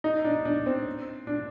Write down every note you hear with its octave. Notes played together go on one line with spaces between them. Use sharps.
D#4
D4
D4
C4
D4